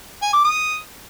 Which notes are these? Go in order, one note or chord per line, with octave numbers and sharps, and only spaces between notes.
G#5
D6
D#6